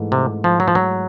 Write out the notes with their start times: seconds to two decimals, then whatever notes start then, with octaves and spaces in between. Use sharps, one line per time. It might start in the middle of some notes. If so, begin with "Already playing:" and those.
Already playing: G#2 E3 A3
0.12 C3
0.44 F3
0.60 F#3
0.68 F3
0.75 F#3